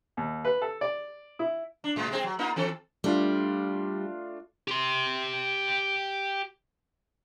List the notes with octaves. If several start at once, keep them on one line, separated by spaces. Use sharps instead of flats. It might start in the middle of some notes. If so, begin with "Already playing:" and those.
D#2
B4
A4
D5
E4
D4
A2 G#3
G#3 C4 G#4
F#3
A#3 D#4 F4
E3 C4 A4
G3 A3 D4 F4
G4 C6